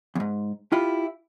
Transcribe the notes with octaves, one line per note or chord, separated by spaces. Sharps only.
E2 G#2
E4 F4 G4